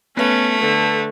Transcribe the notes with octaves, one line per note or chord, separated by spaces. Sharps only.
A3 B3 C#4 B4 F7
D3 B4